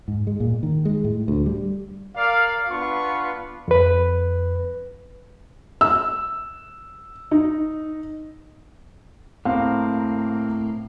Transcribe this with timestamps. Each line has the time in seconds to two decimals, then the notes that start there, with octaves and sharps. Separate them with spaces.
0.08 G#2
0.27 G#3
0.40 A#2
0.63 D#3
0.85 G#3
1.04 A2
1.28 D2
1.46 G3
2.16 A#4 D5 F5
2.69 B3 D4 F4 B4 C#6
3.68 F2 B4
5.81 E6
7.31 D#4
9.45 A2 A#3 C4 F5